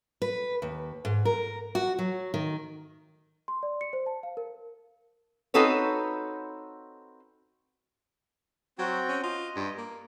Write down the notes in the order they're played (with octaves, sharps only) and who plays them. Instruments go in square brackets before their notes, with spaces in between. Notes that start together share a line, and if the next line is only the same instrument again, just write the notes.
[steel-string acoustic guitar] B4
D#2
G#2
A#4
F#4
F#3
D#3
[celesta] C6
D5
C#7
C5
A5
F5
A#4
[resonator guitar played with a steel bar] C4 D#4 F#4 A4 B4 C#5
[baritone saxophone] F#3 [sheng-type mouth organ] C4 F#4 G5
[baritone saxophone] C#4
[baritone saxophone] F4 [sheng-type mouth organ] D#5
[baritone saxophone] G2
A#3